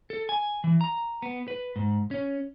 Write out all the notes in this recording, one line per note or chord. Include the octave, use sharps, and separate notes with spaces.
A4
G#5
E3
A#5
B3
B4
G#2
C#4